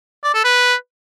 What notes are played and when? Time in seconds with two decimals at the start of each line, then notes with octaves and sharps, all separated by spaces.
0.24 D5
0.34 A4
0.44 B4